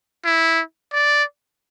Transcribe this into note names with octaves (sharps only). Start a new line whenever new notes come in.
E4
D5